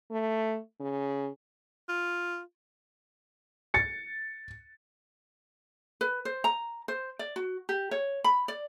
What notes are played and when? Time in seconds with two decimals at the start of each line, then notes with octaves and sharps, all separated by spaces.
0.11 A3
0.80 C#3
1.89 F4
3.74 A6 C#7
6.01 B4
6.25 C5
6.44 A#5
6.88 C5
7.19 D5
7.36 F#4
7.69 G4
7.91 C#5
8.24 B5
8.48 D5